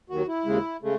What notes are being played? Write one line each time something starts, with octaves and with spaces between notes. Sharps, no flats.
D#2 D#3 F#3 F#4
E4
D#2 C#3 G#3
C#3 G#3 A3